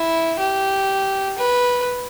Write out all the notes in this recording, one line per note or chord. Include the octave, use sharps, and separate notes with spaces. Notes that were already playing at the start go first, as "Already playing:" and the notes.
Already playing: E4
G4
B4